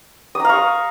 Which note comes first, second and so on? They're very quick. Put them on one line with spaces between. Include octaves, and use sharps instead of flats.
D#6 A#5 F5 C#6